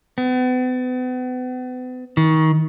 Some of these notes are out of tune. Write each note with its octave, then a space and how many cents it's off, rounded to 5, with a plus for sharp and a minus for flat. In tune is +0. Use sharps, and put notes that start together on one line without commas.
B3 +40
D#3 +30